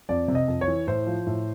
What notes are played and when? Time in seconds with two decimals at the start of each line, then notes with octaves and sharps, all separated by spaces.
0.09 F2 D5
0.28 C3
0.35 D#5
0.48 F2
0.61 C#5
0.68 E3
0.87 A2 C5
1.07 F3
1.26 A2